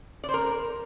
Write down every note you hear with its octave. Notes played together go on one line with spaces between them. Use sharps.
D5
C5
A#4